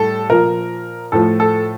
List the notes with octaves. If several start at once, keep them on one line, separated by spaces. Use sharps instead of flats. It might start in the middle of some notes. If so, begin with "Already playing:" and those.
Already playing: A2 G3 A4
A#2 F3 A#4
A2 F3 A4
A4